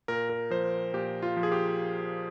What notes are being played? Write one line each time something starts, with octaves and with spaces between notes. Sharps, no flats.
A#2 A#4
A#4
F3 C5
A#2 G4
F4
F3
G#4
G4